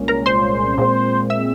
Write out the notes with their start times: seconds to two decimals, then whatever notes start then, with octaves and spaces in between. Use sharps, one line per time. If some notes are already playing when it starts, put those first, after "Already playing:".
Already playing: C2 A#2 G#3 C#4
0.08 A#4 A#5
0.26 C5 C6
0.78 A#2 G#3 C4
1.30 E5 E6